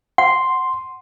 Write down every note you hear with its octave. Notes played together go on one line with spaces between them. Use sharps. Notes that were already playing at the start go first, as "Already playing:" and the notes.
F#5 C6